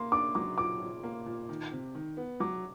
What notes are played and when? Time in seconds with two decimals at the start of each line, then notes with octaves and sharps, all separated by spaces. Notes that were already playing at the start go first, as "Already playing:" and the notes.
Already playing: A#3 C6
0.12 D4 D6
0.35 F#3 D6
0.57 A#2 D6
0.81 A#2
1.03 A#3
1.26 A#2
1.49 D#3
1.72 C3
1.95 D#3
2.17 B3
2.40 F#3 D6